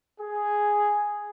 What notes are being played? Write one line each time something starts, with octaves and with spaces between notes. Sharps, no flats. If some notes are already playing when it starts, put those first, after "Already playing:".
G#4